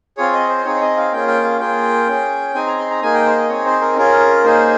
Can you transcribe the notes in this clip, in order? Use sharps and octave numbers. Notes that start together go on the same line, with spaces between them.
C4 F4 G#4 C#5
D#5
C5
C4 D#4 G#4 C#5
C#5
D#5
F5
A#3 C#4 F4 G#4 G5
G5
F5
A#3 F4 G#4 G5
C#4 G#4
C4 D#4 G#4 G#5
A#5
C6
A#5
A#3 D#4 G#4 G#5
G5
C5
D#5
C4 D#4 G#4 C#5
C5
A#4
C#4 F4 G#4 A#4
A#3 D#4 G#4 C5